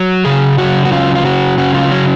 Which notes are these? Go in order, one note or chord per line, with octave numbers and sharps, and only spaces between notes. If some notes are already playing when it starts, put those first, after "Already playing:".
Already playing: F#3
C#3 G#4
F#3 F#4
F#4
C#3 F4
F4
F#3 F#4
C#3 F#4
F4
F#3 C#4